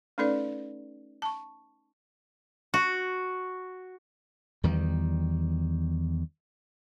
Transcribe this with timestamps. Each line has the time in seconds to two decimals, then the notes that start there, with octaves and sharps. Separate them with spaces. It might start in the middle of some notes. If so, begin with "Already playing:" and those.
0.18 A3 C#4 D#4 A4 B4 D5
1.22 A5 C#6
2.74 F#4
4.64 E2 D#3 G3